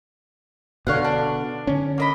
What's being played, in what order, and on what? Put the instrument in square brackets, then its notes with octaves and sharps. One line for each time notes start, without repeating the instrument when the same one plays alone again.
[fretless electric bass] B2 D3 [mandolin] C#5 F5 F#5
[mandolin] D4
[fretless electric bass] D3 C#4
[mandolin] A#3 D#5 B5